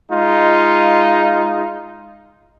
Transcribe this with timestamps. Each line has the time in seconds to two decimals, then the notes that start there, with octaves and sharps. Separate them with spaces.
0.11 G#3 D#4 F4